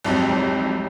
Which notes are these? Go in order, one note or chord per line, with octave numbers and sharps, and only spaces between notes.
C2 F2 G#2 C3 F#3 G3